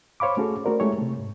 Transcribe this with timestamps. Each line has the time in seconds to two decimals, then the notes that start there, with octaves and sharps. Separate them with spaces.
0.20 C5 C#5 F5 B5 D6
0.37 A3 C#4 F#4 G#4 A4
0.65 A3 C#4 F#4 A#4 C5 D5
0.80 G#3 A3 E4 G4 C#5
0.98 C3 A3
1.19 G#2